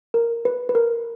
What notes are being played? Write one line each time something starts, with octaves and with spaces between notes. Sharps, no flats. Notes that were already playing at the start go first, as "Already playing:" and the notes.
A#4
B4
B4
A#4